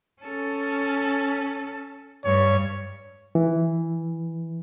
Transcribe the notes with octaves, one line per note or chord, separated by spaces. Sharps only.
C#4 A4
G2 C#5
E3